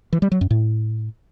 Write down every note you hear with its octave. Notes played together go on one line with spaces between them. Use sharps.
E3
G3
F#3
F#2
A2